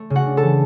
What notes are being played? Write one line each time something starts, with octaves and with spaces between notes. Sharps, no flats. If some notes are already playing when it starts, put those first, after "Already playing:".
Already playing: A3
C#3
F#4 F#5
D4
A4 A5
E3